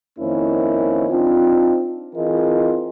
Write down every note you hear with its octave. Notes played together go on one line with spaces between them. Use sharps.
F2 D#3 A#3 C#4 E4 C5
C4 D4 D#4 F4
E3 C4 F4 G#4 A#4 D#5